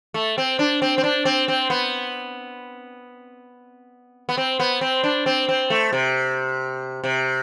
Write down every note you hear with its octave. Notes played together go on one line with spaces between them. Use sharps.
A3
C4
D4
C4
C4
D4
C4
C4
B3
B3
C4
B3
C4
D4
C4
C4
A3
C3
C3